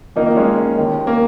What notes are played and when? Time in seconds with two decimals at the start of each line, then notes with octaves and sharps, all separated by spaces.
0.16 F2 A#3 D#4
0.19 D#3
0.26 A#3 D#4
0.36 G#3 C#4
0.78 D#2 D#3
1.07 A#3